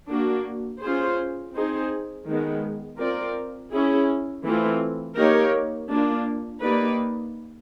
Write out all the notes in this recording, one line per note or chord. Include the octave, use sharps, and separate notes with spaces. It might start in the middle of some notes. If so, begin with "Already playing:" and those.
A#3 D4 F#4
C#4 F4 G#4 C5
C4 D#4 G#4 C5
D#3 G#3 B3
C4 F4 A#4 D5
C#4 E4 G#4
E3 A3 C4 F4
A#3 D#4 G4 A#4 C#5
A#3 D4 F4
A#3 D#4 G4 B4 D5